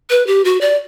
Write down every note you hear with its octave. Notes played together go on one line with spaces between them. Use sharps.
B4
G4
F#4
D5